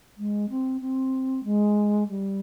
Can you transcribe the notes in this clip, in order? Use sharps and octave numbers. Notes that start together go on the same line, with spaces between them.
G#3
C4
C4
G#3
G3